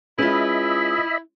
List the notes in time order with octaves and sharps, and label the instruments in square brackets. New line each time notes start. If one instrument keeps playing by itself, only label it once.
[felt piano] G#3 C#4 [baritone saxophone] E4 [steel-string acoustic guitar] F4 B4 [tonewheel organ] D#5 E5 B5